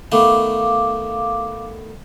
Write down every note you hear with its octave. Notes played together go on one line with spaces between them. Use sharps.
D#3 A3 B3 F5 D6